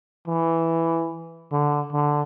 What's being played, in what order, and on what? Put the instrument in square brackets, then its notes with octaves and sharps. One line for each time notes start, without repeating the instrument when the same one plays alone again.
[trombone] E3
D3
D3